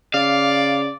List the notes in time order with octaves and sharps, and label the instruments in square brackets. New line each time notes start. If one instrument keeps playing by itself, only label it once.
[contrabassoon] C#3 [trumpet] D5 [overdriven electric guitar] F5